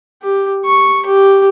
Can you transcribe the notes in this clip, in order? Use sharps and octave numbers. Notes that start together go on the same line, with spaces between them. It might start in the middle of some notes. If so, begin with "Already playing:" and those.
G4
C#6
G4